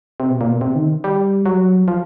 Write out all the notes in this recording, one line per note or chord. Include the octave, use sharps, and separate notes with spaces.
C3
B2
A#2
B2
C3
D#3
G3
F#3
F3